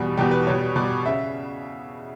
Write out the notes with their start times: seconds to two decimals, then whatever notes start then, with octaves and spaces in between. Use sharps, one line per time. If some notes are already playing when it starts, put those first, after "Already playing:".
Already playing: E2 B2 G3
0.17 E2 B2 G3 G4
0.31 B4
0.47 B2 G3 C#5
0.76 B2 G3 D5
1.06 C#3 E5